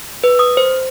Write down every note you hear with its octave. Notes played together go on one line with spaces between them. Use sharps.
B4
D#6
C5